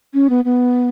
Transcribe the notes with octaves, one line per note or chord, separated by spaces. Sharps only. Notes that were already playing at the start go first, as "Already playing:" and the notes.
C#4
B3
B3